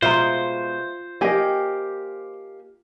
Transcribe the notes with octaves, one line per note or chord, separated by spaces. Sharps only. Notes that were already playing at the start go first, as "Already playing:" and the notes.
B2 G#3 F4 C5 E5 A#5
A#3 G4 D#5 G#5